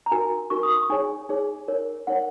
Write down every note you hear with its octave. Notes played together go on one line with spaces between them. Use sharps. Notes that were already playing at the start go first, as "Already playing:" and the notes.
A#5
D#4 F#4 A#4 G#5
D#4 F#4 A#4 C#6
D#6
C#6
D#4 G#4 C#5 G#5
D#4 G#4 C#5
D#4 A#4 C#5
D#4 A#4 C#5 F#5